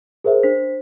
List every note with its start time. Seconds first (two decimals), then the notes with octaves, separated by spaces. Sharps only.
0.24 G#4 A#4 C5 E5
0.43 D4 C5 B6